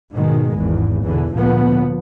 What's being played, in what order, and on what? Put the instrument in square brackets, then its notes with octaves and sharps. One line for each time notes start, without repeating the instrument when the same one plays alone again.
[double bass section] G#2 B2 D#3 G#3
G#1 E2 G#2
E2 B2 D3 E3
D2 A#2 D3 F3 B3